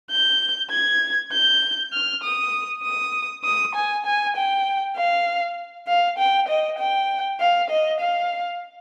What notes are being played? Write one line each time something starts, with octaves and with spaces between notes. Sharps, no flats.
G6
G#6
G6
F6
D#6
D#6
D#6
G#5
G#5
G5
F5
F5
G5
D#5
G5
F5
D#5
F5